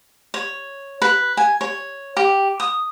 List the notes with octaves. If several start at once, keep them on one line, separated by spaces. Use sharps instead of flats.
C#5
B4
G#5
C#5
G4
D#6